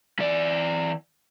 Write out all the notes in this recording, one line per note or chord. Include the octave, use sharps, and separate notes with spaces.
E3 D5